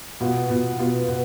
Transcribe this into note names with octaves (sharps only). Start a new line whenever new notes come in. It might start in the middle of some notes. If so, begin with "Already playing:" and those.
B2 B3 F4
B2 B3 F4
B2 B3 F4
B2 B3